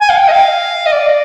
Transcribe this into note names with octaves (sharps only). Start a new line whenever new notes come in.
G#5
F5
G5
D#5
F5
D#5
D5